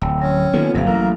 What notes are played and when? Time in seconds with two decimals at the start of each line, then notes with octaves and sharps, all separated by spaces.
0.02 D1 G5 E6
0.22 F#3 C#4
0.53 D#3 A#3 B3 F4 A4
0.74 G1 G2 C3 F#3 F5
0.86 A1 A#4